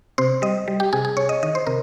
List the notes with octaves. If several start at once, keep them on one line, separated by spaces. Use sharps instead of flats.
C3 C5
G3 D#5
G3
G4
C3 G#4
G#4
C3 C#5
D#5
D#3 D#5
C5
C3 A#4